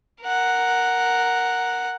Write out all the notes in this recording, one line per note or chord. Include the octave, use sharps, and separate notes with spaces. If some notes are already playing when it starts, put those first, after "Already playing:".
A#4 F#5